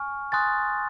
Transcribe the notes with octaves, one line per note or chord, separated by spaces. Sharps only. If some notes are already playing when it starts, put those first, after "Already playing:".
Already playing: G#5 C#6 F6
G#5 C6 D#6 F#6 A6